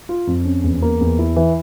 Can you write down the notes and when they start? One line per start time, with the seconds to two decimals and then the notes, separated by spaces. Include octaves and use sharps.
0.09 F4
0.27 F2
0.45 C#4
0.64 E2
0.82 A#3
1.01 E2
1.19 E4
1.36 E3